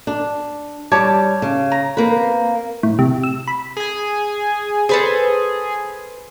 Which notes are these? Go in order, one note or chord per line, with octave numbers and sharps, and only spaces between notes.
D4
G3 C#5 A5 D6
C#3
A#5
A#3 C4 B4
A2
C3
E6
B5
G#4 G#5
G#4 A4 B4 C5